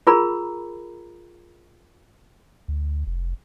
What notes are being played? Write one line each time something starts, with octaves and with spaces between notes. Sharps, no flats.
F4 G#4 A#4 A#5 B5
D2
F1